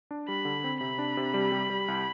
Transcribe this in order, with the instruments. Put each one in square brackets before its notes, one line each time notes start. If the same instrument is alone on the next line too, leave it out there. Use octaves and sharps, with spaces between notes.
[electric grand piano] D4
[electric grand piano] G3 [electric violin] B5
[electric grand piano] D3
C4
[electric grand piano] C3 [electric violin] B5
[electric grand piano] D4
C3
G3
G3
G3
C2